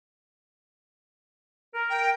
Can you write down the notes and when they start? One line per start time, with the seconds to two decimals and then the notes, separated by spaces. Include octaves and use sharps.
1.74 A#4
1.90 G5